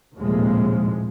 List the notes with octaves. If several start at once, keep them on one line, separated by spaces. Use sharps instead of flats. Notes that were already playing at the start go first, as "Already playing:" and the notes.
A#1 D#2 A2 C3 F3 G#3